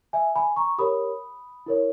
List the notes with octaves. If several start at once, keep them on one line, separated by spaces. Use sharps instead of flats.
E5 G#5
G#5 B5
A#5 C#6
G4 A#4 C#5 B5 D#6
E4 A#4 C#5